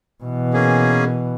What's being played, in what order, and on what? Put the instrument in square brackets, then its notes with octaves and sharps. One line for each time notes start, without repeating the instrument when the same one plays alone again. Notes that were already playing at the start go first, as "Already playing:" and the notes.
[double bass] B2 E3
[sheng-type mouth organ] A#3 C#4 G#4